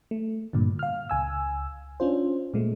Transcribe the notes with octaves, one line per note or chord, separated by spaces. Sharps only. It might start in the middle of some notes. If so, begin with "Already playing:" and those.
A3
G2 A#2 D3
F5 F6
C#2 G#5 E6
C#4 D4 F4 C5
A#2 G#3 A3